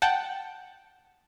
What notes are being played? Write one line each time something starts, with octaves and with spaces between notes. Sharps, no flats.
F#5 G5 A5